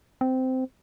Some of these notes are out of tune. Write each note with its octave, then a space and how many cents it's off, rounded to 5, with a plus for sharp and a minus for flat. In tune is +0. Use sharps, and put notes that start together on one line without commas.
C4 -15